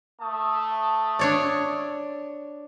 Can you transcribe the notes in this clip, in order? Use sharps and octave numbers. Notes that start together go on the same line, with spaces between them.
A3 A5 D#6
D4 C#5 D5